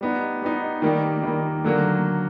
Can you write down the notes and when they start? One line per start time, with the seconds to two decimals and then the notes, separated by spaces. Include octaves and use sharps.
0.01 G3 B3 D#4
0.42 G3 B3 D#4
0.82 D#3 G3 A#3
1.23 D#3 G3 A#3
1.64 D3 F#3 A#3